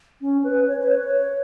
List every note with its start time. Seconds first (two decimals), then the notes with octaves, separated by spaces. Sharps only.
0.21 C#4
0.44 B4
0.68 C#5
0.79 B4
0.91 C#5